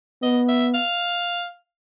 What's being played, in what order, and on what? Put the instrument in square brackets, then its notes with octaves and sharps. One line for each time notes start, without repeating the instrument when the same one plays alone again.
[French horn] B3 [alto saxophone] D#5
[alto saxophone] E5
F5